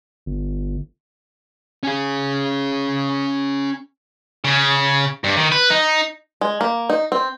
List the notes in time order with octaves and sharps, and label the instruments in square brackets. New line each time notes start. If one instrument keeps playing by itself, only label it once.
[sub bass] G1
[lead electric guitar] C#4 G#4
[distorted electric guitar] C#3
G2
D#3
B4
D#4
[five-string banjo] G#3
A#3
D#4
C4